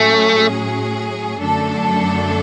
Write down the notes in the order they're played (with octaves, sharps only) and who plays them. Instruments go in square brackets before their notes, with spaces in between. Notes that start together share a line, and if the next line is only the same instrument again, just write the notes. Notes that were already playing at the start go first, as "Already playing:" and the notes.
Already playing: [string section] A2 F#3 C#4 G#4 [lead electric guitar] A3
[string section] F#2 D3 A3 D4 A4